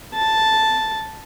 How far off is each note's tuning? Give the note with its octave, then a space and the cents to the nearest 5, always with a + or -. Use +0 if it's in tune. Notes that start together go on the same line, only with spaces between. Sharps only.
A5 +0